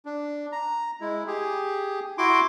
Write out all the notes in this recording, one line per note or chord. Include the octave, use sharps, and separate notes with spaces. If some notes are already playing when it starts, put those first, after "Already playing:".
D4
A#5
G#3 E4
G4 G#4
E4 F#4 C6 D6